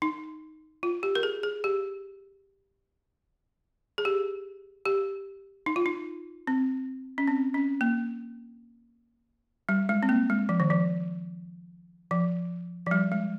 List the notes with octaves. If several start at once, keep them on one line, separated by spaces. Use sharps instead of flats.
D#4
F4
G4
A#4
G#4
G#4
G4
G#4
G4
G4
D#4
F4
D#4
C4
C#4
C4
C#4
A#3
G3
G#3
C4
A#3
G#3
F3
D#3
F3
F3
F3
G3
G#3